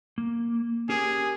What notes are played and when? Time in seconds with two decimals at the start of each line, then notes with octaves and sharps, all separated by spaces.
0.18 A#3
0.89 C#4 G4 G#4 A#4